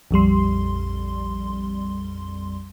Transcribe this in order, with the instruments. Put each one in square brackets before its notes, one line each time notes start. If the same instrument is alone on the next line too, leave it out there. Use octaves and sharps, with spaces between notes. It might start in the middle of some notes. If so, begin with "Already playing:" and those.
[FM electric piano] A#1 F2 G3 C6